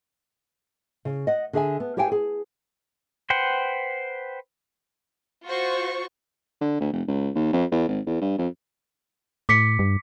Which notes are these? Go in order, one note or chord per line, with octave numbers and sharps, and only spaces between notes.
C#3
D#5 F#5
D3 G#4 E5 G#5
B3
E4 G4 C#5 F5 G5 G#5
G#4
B4 C5 F#5 G5
F4 F#4 C5 C#6
D3
D2
F1
C#2
D#2
F2
E2
G#1
E2
G2
F2
A2 D6 B6 C#7
G2